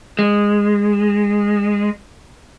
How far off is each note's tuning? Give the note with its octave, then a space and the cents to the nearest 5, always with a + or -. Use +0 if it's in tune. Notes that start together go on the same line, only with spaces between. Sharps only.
G#3 -15